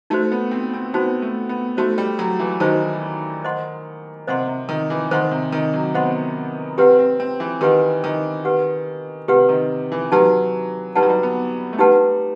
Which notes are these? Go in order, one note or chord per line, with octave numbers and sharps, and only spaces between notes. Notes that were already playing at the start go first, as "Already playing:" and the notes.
A3 D#4 F#4 C5
B3
C4
C4
B3 D#4 F#4 C5
A3
B3
A3 D#4 F#4 C5
G3
F#3
E3
D#3 D#4 F#4 C5
C5 D#5 F#5 C6
C3 C5 D#5 F#5 C6
C3
D#3
E3
D#3 C5 D#5 F#5 C6
C3
D#3
F#3
B3 C5 D#5 F#5 C6
C4 G4 B4 F#5
C4
C4
E3
D#3 G4 B4 F#5
D#3
G4 B4 F#5
C3 G4 B4 F#5
D#3
E3
F#3 D#4 G4 B4 F#5 A5
G3 D#4 G4 B4 F#5 A5
F#3
G3
B3
A3
G3 D#4 G4 B4 F#5 A5